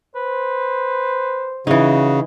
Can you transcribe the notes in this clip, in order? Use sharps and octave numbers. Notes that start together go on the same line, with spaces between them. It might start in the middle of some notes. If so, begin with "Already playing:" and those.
B4 C5
C#3 E3 D#4 F#4